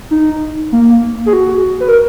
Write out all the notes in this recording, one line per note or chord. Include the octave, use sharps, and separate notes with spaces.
D#4
A#3
G#4
F#4
B4
A#4